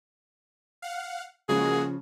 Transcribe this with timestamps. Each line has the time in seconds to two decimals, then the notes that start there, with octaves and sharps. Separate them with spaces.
0.82 F5 F#5
1.49 C#3 F3 G#3 A#3 F#4 G#4